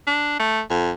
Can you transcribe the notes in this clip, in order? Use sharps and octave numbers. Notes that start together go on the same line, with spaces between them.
D4
A3
F2